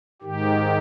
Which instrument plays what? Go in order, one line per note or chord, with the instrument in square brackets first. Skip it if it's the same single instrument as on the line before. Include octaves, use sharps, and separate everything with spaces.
[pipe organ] G#2 D#3 G4